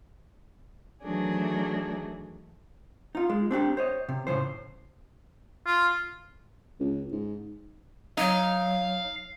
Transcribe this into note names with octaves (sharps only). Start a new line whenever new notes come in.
D#3 E3 F#3 A3 D4 G#4
D#4 F4
G#3
C4 D4 F#4 G4
C5 C#5 D#5
C3
A2 C#3 E3 C5
F4
C#2
G#2
F#3 D#4 F5